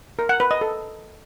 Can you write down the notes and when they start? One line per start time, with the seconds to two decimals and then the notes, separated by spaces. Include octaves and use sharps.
0.19 A#4
0.29 F#5
0.40 B4
0.51 D#5
0.61 A4